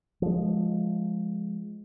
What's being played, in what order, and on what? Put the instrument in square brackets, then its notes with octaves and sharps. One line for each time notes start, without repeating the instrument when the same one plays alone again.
[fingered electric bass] F3 G#3